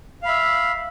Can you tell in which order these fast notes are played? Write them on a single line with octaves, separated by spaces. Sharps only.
F5 B5 E5